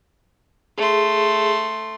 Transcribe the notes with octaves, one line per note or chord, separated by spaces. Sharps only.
A3 G#4 C6